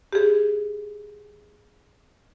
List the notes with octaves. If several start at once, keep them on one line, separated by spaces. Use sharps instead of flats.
G4 G#4